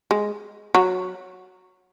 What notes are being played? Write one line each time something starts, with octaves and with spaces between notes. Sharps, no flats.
G#3
F#3